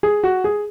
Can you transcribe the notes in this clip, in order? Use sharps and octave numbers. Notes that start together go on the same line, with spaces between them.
G#4
F#4
G#4